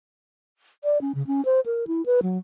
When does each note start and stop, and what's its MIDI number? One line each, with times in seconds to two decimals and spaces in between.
0.84 1.01 74
1.01 1.12 61
1.15 1.25 49
1.27 1.44 61
1.45 1.60 72
1.66 1.85 70
1.87 2.05 64
2.06 2.20 71
2.22 2.38 54